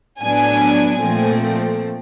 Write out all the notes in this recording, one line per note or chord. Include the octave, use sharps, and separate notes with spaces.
A2 F#3 B3 D4 G#5
A#2 F3 A3 C4